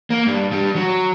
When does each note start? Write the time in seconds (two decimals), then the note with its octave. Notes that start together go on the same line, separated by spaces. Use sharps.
0.10 A#3
0.27 G2
0.52 G2 G3
0.76 F#3